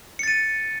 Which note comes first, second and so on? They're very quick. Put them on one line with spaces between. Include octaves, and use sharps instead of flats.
C#7 A6 D#7